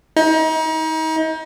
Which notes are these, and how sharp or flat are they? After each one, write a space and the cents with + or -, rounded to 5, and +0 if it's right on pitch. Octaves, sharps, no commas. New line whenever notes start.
D#4 +35